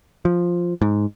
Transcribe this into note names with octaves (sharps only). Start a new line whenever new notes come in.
F3
G#2